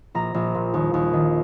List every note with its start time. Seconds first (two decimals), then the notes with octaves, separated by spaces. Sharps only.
0.15 A#1 A#5
0.34 A#1
0.55 A#2
0.74 D#2
0.94 D#2
1.13 D#3